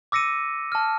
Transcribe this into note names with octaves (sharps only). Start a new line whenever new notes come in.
D6 E6 A#6 C#7 D#7
A5 F6